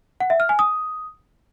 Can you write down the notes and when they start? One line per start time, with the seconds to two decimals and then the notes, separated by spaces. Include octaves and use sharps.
0.20 F#5
0.30 E5
0.40 F6
0.49 G#5
0.59 D#6